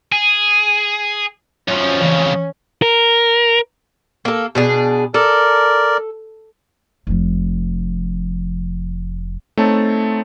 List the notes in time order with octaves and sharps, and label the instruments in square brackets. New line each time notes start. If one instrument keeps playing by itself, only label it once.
[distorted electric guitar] G#4
[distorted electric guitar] F#2 F3 [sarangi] C#4
[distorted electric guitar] F2 C#3 [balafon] E3
[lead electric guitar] A#4
[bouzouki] A#3 A4
B2 D4 G#4
[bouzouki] A4 [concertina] A#4 D5
[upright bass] F1 F3
[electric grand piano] A3 C4 D#4 C#5 A5